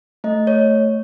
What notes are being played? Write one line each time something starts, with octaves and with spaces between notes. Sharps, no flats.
A3 D#5
A3 C#5